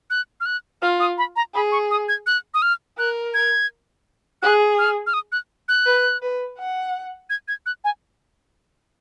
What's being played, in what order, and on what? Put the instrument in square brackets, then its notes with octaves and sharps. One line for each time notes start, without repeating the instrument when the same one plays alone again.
[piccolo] F#6
F6
F#6
[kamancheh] F4 [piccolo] F6
[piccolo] D#6
B5
A#5
[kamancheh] G#4 [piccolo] B5
[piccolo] C#6
D#6
G#6
F#6
D#6
F6
[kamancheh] A#4 [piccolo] F#6
[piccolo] G#6
[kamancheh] G#4 [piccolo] F#6
[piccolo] F6
F6
D#6
F#6
F#6
[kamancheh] B4
B4
F#5
[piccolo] G#6
G#6
F#6
G#5